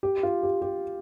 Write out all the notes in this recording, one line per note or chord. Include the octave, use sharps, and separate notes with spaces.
G4
F4
G4
G4